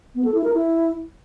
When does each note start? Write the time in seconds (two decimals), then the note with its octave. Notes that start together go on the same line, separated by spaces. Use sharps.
0.15 B3
0.25 A4
0.34 E4
0.44 A#4
0.54 E4